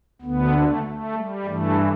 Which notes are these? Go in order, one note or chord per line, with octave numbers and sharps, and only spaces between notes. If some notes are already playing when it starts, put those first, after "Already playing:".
D2 D3 B3
A3
A3
G3
G2 E3 A3